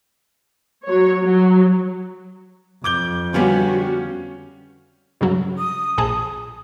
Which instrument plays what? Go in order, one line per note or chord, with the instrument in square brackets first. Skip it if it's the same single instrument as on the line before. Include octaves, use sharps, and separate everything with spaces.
[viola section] F#3 C#5
F#3
[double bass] F2 [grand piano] D6 G6 G7
[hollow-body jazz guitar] D3 G3 B3 [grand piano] C#4 F5 G#5 [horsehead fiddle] F#4 G4
[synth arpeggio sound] G2 C#3 F#3
[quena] D#6
[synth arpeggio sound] A#1 G#4 A5